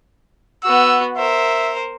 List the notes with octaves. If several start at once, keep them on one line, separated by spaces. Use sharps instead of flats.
B3 F#4 E6
A#4 C5 E5